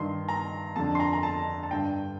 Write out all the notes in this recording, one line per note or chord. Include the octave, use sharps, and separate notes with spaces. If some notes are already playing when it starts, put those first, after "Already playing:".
Already playing: G2 D#3 C6
A#5
F2 D3 A5
C6
A#5
A#5
A5
A5
G2 D3 G5